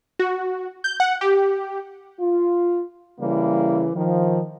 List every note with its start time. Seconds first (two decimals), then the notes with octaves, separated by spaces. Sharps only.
0.19 F#4
0.84 G6
1.00 F#5
1.21 G4
2.19 F4
3.19 C#3 E3 G3 A#3 E4
3.94 D#3 F3